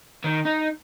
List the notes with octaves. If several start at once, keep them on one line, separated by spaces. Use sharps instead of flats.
D#3
D#4